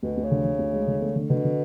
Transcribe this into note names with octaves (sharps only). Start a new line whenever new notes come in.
D2 B2
D2
C#3
D3
D3
D2
G#3
D3
A3
D3
B2 D3
D3